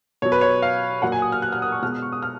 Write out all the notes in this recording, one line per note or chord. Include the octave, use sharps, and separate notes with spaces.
B2 F#3 C#5
B4
C#5
F5
A#2 F#3 F#5
G#5
D#6
F6
F#6
F6
D#6
C#6
B2 G#3 F6
D#6
C#6
D#6
F6